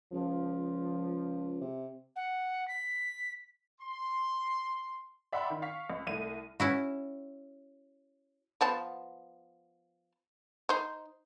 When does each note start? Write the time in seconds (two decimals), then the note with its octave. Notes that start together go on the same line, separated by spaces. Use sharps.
0.13 C#2 F3
1.61 C3
2.16 F#5
2.68 B6
3.81 C6
5.32 D5 E5 F#5 G5 B5 C6
5.50 D#3
5.62 F5 C#6 B6
5.90 C#2
6.07 C2 A3 D#7
6.60 C#4 E4 F#4
8.61 F3 B3 A5
10.69 D#4 C5